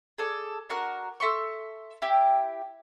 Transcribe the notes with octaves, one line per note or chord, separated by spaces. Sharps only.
G#4 A4 D5
D4 F#4 A#4 F#6
A4 E5 C6 C#6
E4 G4 G5